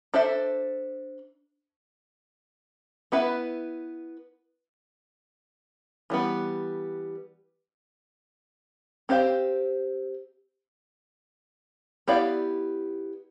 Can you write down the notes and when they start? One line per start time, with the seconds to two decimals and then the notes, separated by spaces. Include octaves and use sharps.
0.14 D4 A4 C5 E5
3.12 B3 E4 B4 E5
6.10 E3 G3 B3
9.09 C4 G4 C5 F5
12.07 B3 E4 G4 D5 F5